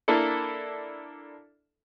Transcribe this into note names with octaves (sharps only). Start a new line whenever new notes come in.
A#3 D4 E4 A4